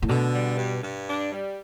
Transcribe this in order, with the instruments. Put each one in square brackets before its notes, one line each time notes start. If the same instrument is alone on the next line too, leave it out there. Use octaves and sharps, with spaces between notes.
[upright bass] A2
[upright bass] B2 [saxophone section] D3
[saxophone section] G3
G2
G2
D4
G3